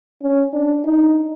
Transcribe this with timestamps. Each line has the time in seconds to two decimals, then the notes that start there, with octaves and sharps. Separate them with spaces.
0.22 C#4
0.53 D4
0.84 D#4